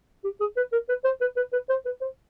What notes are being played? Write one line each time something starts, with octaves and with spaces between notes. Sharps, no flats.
G4
G#4
B4
A#4
B4
C5
B4
B4
B4
C5
B4
C5